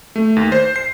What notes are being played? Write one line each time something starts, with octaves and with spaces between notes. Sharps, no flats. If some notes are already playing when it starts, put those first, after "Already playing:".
A3
D#2
C5
C7